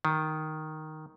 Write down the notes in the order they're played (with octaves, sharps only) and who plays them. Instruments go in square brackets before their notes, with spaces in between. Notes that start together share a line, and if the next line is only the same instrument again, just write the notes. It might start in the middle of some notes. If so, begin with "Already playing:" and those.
[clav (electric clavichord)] D#3